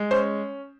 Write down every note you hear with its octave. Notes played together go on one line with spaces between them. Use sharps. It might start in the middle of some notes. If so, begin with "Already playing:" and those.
Already playing: G#3
C#4 C5